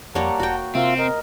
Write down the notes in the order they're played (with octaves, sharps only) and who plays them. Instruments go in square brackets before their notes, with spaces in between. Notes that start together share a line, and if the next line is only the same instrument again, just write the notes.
[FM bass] F2 [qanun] G3 A#3 C#5 [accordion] F#5 A5 A#5
[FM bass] E1 [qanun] F#4 G5
[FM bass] C3 [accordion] A#3 F4 E5 [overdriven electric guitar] C4
[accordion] A#4 D#5